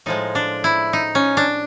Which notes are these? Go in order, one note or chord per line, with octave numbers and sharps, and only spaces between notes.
A2 F3 G#3 D#4
D4
E4
D#4
C#4
D4